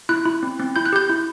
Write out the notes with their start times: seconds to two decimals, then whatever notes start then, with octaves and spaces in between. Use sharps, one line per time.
0.09 E4 F#6
0.25 E4
0.43 C4
0.59 C4
0.76 E4 G6
0.86 F#6
0.93 G4 G6
1.09 E4